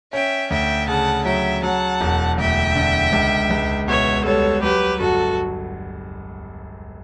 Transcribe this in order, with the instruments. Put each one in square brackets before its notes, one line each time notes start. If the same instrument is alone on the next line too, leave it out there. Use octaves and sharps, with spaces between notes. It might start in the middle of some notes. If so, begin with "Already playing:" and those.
[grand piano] C#4 [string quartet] E5 G5
[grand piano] D2 [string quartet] E5 G5
[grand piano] C#3 [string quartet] F#5 A5
[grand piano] F#3 [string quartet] E5 G5
[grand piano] F#3 [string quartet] F#5 A5
[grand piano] E1
[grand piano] D2 [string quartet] E5 G5
[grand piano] D3
C#2
C#2
[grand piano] B2 [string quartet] C#5 E5
[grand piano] G3 [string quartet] A4 C#5
[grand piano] F#3 [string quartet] G4 B4
[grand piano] G1 [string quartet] F#4 A4